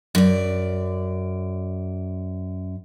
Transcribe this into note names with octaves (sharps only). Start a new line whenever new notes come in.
F#2 D5